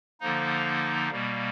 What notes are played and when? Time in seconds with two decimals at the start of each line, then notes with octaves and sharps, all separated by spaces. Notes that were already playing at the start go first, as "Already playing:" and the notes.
0.21 D3 F3 A#3 D#4
1.11 B2 G3 A#3